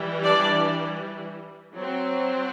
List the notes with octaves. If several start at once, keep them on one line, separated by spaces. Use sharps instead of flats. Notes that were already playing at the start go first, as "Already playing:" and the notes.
Already playing: E3 G3
D4 D5
F#3 C4